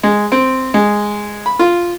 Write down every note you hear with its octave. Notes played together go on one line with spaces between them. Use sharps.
G#3
C4
G#3
B5
F4